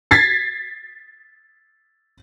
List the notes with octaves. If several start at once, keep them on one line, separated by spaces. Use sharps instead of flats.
G#6 A6 B6 C7